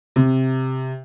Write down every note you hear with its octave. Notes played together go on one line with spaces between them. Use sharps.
C3